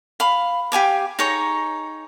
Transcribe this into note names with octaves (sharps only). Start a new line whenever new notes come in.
F5 B5
G4 F5 G#5 D6
D#4 G#4 C#5 A#5